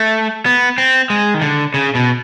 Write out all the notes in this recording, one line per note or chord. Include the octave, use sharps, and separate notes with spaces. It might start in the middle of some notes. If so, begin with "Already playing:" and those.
Already playing: A3
B3
C4
G#3
D#3
D3
C#3
B2